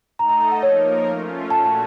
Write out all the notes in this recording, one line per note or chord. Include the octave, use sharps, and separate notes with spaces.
A3 D#4 A4 D#5 A#5
A#5
A#5
F#5
F3 A#3 D#4 A#4 C#5
A3 C#4 F4
A#2 A3 C#4 F#4 A5
A5